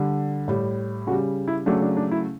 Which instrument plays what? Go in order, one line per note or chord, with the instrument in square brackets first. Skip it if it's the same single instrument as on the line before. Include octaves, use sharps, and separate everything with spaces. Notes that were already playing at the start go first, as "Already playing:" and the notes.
Already playing: [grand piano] D3 G3
A2 G3
C#3 F#4
G3
E4
C#3 F#3 A3 D4
D4
D4
E4